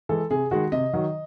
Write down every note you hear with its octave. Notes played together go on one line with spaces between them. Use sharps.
E3 G#3 A4
C3 G#4
D#3 G#3 F#4
C3 D#5
D#3 F#3